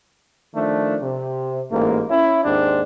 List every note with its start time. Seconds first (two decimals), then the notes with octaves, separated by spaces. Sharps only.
0.54 D#3 F3 A3 D4
1.01 C3
1.70 A1 G#2 A#3
2.09 C#4 E4
2.44 D#2 G#2 C4 D4